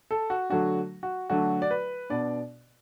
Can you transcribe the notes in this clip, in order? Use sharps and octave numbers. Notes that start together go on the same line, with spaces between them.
A4
F#4
D3 F#3 A3 D4 F#4
F#4
D3 F#3 A3 D4 F#4
D5
B4
B2 B3 D4 D5